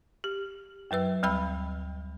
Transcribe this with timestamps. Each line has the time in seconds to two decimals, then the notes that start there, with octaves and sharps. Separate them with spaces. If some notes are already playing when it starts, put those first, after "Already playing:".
0.24 G4
0.91 F#2 F#3 B4 E6
1.23 D2 G3 G5 B5 E6